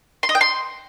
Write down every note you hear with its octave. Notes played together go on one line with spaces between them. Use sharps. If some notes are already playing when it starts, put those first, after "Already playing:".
C6
D#5
G5
C6